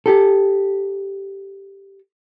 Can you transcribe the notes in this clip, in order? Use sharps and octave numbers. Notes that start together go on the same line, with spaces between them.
G4 A4